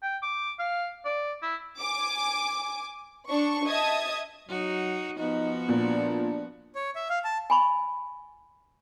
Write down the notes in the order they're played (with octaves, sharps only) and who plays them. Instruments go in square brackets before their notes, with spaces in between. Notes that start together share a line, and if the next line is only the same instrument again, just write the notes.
[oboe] G5
D6
F5
D5
E4
[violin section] G#5 D6
D4 C#6
D#5 E5 A5 D#6 G#6
[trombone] F#3 [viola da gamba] D#4 F#4
[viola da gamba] F3 B3 F#4 [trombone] D#4
[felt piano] A#2 [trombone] D4
[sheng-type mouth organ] C#5
E5
F5
A5
[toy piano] G#5 B5 C#6